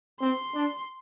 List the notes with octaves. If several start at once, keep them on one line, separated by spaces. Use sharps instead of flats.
C4 C6
D4